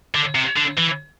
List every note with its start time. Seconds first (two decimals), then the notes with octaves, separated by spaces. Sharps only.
0.14 D3
0.35 C3
0.56 D3
0.78 E3